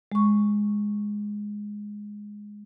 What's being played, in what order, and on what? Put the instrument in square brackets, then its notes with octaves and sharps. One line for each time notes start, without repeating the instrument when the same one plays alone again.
[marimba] G#3 C#6